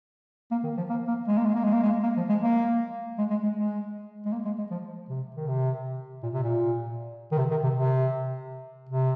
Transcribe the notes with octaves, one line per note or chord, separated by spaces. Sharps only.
A#3
D#3
F3
A#3
A#3
G#3
A#3
G#3
A#3
G#3
A#3
G#3
A#3
F3
G#3
A#3
G#3
G#3
G#3
G#3
G#3
A#3
G#3
G#3
F3
C3
D#3
C3
A#2
C3
A#2
D#3
C3
D#3
C3
C3
C3